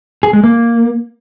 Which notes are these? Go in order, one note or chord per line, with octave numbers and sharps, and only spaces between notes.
G#4
G#3
A#3